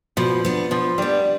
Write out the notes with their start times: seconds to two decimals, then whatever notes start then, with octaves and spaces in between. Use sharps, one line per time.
0.17 B2 F3
0.45 B3 D4
0.71 B2 F3
0.98 G3 B3 D4